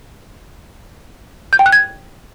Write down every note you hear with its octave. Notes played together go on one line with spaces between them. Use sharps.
G6
G5
F#6
G#6